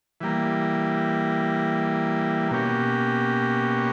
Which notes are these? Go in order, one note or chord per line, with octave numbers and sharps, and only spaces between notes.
E3 G3 A#3
B2 A#3 C#4 G4